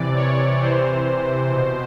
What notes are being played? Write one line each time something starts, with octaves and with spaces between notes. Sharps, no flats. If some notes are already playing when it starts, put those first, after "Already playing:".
Already playing: C3 E3 D5
C#5
C3 E3 C5
B2